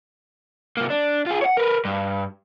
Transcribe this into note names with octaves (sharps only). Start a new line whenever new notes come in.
C3 A#3
D4
F4 G#4
C#5 F#5
A#4 B4
G2